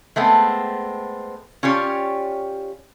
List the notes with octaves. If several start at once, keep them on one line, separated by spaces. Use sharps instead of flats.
G#3 A3 B3 C4
C#4 F4 G4 C#5 D5